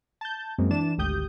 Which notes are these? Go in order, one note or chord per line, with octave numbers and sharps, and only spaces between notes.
A5 G6
F#2 G#3 A#3 C4
E3 D4 A5 E7
G#1 D2 G4 D#6 G6